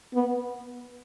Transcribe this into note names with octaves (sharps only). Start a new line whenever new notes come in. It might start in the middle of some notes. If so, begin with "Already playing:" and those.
B3